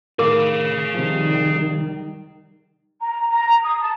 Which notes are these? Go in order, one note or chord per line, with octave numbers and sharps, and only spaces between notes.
A2 D#3 A3 G#4 A#4 F5 D6
C3 D#3 F3 G3
A#5
A#5
D#6
A5